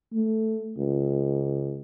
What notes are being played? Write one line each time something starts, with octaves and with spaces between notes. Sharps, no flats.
A3
C#2